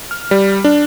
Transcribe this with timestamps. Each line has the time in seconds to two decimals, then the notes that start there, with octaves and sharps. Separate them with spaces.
0.11 F6
0.31 G3
0.64 D4